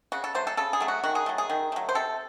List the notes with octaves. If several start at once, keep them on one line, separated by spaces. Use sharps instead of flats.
C#3 F#4
A4
F#3 A3 C5
A4
C#3 A4
G#4
F#3 A3
F#4
D#3 F#4
G#4
F#3 A3
G#4
D#3
F#3 A3
C5
C3 A4